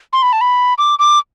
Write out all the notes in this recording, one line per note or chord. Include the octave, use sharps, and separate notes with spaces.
C6
B5
A5
B5
D6
D6